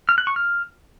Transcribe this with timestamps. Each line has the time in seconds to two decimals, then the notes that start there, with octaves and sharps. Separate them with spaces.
0.09 F6
0.18 F#6
0.27 C#6
0.36 F6